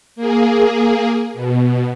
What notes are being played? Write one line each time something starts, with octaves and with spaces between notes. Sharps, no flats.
A#3 G#4
B2